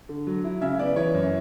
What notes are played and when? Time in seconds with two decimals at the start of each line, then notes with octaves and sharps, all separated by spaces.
0.09 D3
0.27 F#3
0.44 E4
0.61 C#3 E5
0.79 B3 D5
0.96 E3 C#5
1.14 F#2